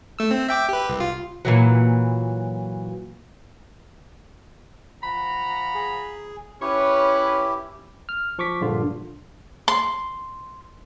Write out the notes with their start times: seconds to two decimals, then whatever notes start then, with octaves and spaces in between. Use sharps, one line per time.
0.19 A3 E6
0.31 C4
0.48 E5 G5 D6
0.69 G4 B4
0.89 C2
1.00 F4
1.45 A#2 E3 F#3
5.03 F3 F#5 A#5 B5
5.75 G#4
6.61 C#4 E4 G4 B4 C#5
8.09 F6
8.39 F3 C#6 D6 B6
8.61 A#1 G2 D3 F4
9.68 C6